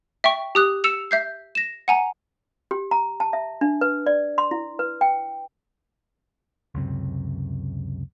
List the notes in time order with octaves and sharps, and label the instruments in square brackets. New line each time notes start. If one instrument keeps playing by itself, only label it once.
[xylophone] E5 G5 C#6
G4 D#6 F#6
E6 C#7 E7 F7
E5 G6 C7
A#6 E7
F#5 G#5 A#5
[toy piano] G4
A#5
A5
E5
D4
B4
D5
C6
E4
B4
G5
[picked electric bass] C#2 F#2 C3